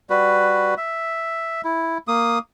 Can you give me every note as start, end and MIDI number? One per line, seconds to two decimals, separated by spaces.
0.10 0.74 55
0.10 0.74 66
0.10 0.74 71
0.77 1.61 76
1.65 1.98 64
2.08 2.39 58
2.08 2.39 87